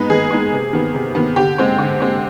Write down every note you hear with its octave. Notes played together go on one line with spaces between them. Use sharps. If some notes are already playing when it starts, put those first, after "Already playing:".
Already playing: G#3 B3 D#4 B4
D#3 G#4
G#3 B3 D#4
C3
D#3 B3
C3
D#3 B3
D3 G4
G#3 C4
D3
G#3 C4